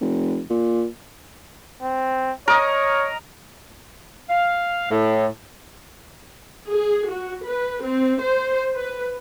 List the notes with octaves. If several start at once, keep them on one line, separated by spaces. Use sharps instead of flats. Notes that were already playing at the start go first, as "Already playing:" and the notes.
F1
A#2
C4
A#4 C#5 D#5
F5
A2
G#4
F#4
B4
C4
C5
B4